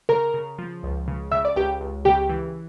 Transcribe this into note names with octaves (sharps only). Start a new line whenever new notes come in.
C#3 A#4 A#5
C#3
F3
C#2
C#3
C#3 E5 E6
D5 D6
C#2 G4 G5
C#2
C#3 G4 G5
E3